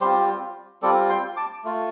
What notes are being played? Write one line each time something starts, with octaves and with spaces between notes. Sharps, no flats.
G3 C4 F4 G4 C5
G3 C4 F4 A4 D5
G5 C6
A5 D6
A3 F4